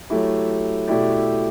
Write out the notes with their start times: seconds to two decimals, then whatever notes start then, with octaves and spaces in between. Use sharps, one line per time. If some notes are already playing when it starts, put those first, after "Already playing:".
0.09 F#3 A3 E4 G4
0.88 B2 A3 E4 G4 D5